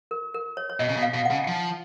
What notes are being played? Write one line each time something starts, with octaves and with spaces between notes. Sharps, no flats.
A#4
A#4
C#5
C#5
B2 D#5
C#3
B2
F5
B2
F#5
C#3
F3